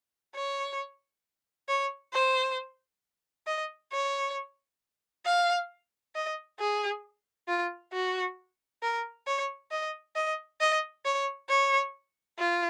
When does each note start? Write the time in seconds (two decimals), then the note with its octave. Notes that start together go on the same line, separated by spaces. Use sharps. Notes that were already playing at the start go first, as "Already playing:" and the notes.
0.36 C#5
1.69 C#5
2.13 C5
3.47 D#5
3.93 C#5
5.25 F5
6.15 D#5
6.60 G#4
7.48 F4
7.93 F#4
8.83 A#4
9.27 C#5
9.71 D#5
10.16 D#5
10.61 D#5
11.05 C#5
11.49 C#5
12.39 F4